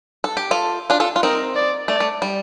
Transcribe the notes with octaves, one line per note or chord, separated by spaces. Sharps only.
A4
G4
F4 A4
D4 F4
F4 A4
F4
C4 D#4 A#4
D5
A3 D5
A3
G3